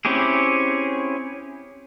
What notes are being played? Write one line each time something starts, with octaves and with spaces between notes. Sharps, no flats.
C4 C#4 E4 G4 G#4